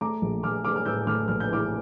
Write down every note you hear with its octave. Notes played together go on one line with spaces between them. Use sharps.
A3 A#5 D6
A#1
A#1 D6 F6
A3 D6 F6
F6
A2 E6 G6
A3 D6 F6
A#1 F6
G6
E3 D6 F6